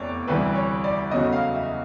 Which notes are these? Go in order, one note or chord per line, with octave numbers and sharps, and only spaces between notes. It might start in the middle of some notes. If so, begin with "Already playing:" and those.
Already playing: F1 E2 C3 C#5 D5
D2 C3 E3 G3 B4
C#5
D5
E2 C#3 F#3 A3 D#5
F5
E5